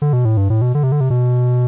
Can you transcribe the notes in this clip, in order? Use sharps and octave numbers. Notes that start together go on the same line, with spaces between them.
D3
B2
A2
G2
A2
B2
D3
C3
D3
C3
B2